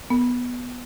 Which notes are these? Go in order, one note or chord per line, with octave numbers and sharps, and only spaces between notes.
B3